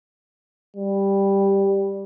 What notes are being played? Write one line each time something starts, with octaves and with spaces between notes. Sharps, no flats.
G3